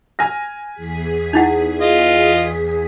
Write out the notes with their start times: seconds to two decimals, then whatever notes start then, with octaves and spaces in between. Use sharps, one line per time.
0.19 G#5 F6 A#6
0.73 E2 G#4 B6
1.33 D#4 E4 F#5
1.81 F4 D#5